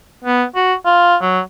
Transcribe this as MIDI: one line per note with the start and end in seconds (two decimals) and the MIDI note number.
0.24 0.44 59
0.55 0.74 66
0.85 1.16 65
1.22 1.39 54